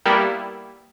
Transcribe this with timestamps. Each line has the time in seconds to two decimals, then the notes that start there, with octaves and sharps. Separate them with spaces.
0.05 G3 A#3 B3 E4 G4